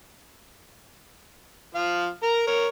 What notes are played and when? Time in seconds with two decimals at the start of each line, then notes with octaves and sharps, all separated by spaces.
1.75 F3 F5
2.23 A#4 A#5
2.47 A#4 C#5